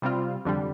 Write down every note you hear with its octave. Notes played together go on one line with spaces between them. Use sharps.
C3 G3 C4 F4
F2 D3 G3